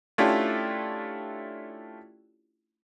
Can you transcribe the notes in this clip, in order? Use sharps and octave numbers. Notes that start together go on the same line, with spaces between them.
A3 C#4 D4 E4 F4 G4